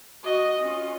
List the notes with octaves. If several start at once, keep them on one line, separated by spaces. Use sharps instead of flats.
F#4 D#5
C#4 F4